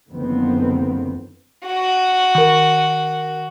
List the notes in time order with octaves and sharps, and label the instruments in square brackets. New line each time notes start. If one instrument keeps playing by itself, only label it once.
[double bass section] F#1 D3 D#3 F3 B3 C4
[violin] F#4
[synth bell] D#3 A#4